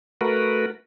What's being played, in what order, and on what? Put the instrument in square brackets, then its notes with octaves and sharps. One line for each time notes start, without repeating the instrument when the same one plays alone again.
[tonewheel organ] A3 F#4 A#4 B4